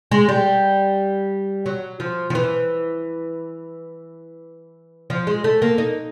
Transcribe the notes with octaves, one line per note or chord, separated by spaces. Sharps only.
G#3
G3
F#3
F3
F3
E3
F3
G#3
A3
A#3
D#4